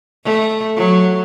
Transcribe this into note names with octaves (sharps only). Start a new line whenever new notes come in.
A3
F#3